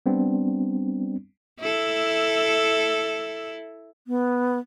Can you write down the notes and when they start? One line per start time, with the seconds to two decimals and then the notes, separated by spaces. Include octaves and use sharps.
0.06 G3 B3 C4 D4
1.60 E4 A4
4.07 B3